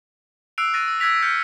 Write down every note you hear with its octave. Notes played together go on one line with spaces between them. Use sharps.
E6 F#6 C7 D7 F7
C#6 F#6 A6 A#6 D7 D#7
E6
E6 F#6 G#6 A#6 B6 F7
E6 F6 G6 A6 C7 C#7